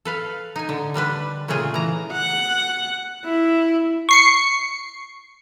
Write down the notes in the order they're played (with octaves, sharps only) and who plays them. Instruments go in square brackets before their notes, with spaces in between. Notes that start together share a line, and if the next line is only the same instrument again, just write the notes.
[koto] A4 B4 F5
D#4 G#5
D3
D3 G3 D4 B4
A#2 C#3 A3 F4 G#4
E3 A#5
[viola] F#5
E4
[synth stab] C#6 C7 C#7